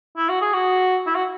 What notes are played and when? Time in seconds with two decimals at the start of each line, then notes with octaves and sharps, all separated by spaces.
0.17 E4
0.29 F#4
0.42 G#4
0.54 F#4
1.06 E4
1.15 F#4